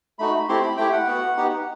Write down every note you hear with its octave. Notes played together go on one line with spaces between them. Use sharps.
A3 D#4 F#4 B5
A3 C4 E4 G4 C6
B5
A3 E4 G4 G5
F#5
B3 F#4
B3 D#4 G4